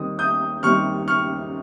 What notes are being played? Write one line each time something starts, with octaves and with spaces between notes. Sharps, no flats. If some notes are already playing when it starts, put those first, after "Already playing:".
Already playing: D#2 D#3 G3 C4 D#4 D#6
D#6 G6
D#2 D#3 G3 C4 D#4 C#6 F6
C#6 F6